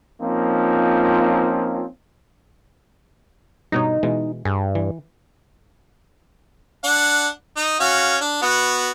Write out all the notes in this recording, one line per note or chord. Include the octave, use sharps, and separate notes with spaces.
F3 A#3 C4 C#4 D#4 F4
G2 B2 D#4 C#5
B2 E3 G#3
G2 G#4
E3
D4 F#5
D#4
C#4 F#4 F5
D4
B3 F#4